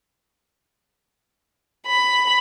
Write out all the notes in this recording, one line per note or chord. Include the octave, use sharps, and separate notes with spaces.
B5